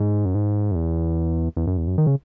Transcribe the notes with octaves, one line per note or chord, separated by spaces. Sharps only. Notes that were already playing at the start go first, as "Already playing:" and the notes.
Already playing: G#2
F#2
G#2
F#2
E2
E2
F#2
E2
F#2
D#3
C#3